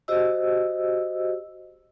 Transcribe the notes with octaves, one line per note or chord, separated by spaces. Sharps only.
F#4 G4 C5 D#5 E6